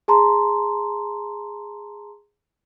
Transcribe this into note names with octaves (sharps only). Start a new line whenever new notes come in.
G#4 A5 A#5 C6